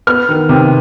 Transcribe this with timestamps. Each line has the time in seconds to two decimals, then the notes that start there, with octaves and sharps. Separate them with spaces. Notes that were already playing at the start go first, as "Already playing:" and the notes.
0.07 B3 F6
0.29 D#3
0.49 C3